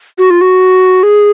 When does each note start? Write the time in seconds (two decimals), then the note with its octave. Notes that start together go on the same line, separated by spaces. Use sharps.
0.18 F#4
0.30 F4
0.41 F#4
1.03 G#4